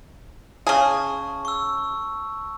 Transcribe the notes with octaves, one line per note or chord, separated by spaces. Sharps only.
C#3 G#4 A5 C#6
C#6 E6